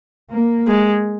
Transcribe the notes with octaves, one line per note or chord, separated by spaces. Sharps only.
A#3
G#3